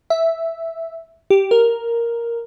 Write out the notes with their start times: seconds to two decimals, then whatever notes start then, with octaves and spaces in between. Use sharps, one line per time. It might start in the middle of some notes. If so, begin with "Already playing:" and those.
0.10 E5
1.30 G4
1.51 A#4